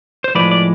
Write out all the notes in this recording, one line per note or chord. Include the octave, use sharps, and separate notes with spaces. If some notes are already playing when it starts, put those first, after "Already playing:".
C5
A2 F3 G#3 B4 D5
D5